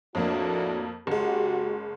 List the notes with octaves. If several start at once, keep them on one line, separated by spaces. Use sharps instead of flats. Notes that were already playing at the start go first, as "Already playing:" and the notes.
F2 A2 A#3 D4 F#4
F#1 G#3 F#4 G4